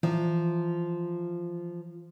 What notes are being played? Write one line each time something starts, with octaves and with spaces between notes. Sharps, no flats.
E3 F3